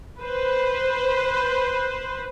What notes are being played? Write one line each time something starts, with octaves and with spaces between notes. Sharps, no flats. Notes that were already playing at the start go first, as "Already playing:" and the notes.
B4 C5